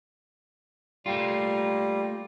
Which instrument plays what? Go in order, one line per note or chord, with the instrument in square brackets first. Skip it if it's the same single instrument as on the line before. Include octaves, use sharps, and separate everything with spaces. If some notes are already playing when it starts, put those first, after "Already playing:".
[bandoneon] G3 [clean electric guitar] A3 A#3 F4